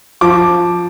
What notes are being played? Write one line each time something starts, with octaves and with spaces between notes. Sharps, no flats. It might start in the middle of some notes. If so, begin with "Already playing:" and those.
F3 D6